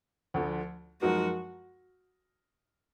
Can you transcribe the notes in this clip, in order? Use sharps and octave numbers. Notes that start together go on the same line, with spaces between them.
D2 D3 F3
F#2 F3 G#3 D#4 F#4 A#4